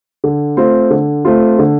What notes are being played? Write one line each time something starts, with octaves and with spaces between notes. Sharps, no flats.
D3
A3 C4 F4
D3
A3 C4 F4
D3